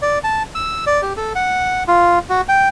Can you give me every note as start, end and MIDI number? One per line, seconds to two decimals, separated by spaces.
0.02 0.19 74
0.24 0.43 81
0.55 0.85 88
0.87 1.01 74
1.02 1.13 67
1.17 1.33 69
1.35 1.83 78
1.88 2.19 65
2.29 2.41 66
2.49 2.69 79